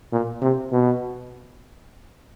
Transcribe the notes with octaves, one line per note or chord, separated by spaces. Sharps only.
A#2
C3
B2